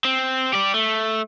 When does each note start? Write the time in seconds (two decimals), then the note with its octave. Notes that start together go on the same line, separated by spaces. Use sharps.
0.05 C4
0.53 G4 D5
0.74 A3